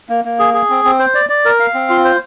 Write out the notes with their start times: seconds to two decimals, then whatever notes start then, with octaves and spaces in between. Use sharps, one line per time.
0.09 A#3
0.25 A#3
0.39 G#4
0.54 G#4
0.70 C4
0.85 C4
0.99 C5
1.15 D5
1.29 D5
1.45 A#4
1.60 F5
1.74 C4
1.90 F4
2.05 C5